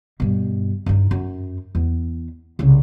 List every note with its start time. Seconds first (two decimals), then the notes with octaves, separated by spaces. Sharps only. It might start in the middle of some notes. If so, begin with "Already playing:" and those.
0.20 G2 B2
0.86 G2 D#4
1.11 F#2
1.75 E2
2.59 C2 C#3